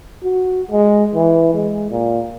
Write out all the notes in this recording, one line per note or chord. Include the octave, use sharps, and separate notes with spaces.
F#4
G#3
E3
G#3
A#2